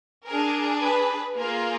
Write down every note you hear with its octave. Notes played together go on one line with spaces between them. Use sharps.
D4 G#4 A#4
B4
A#3 F4 G#4 A#4